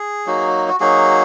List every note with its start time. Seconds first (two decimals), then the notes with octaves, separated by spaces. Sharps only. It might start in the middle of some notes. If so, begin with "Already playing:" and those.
Already playing: G#4
0.27 F#3 A#3 D#4 F#4
0.68 F#4
0.80 F#3 A#3 D#4 F#4 G#4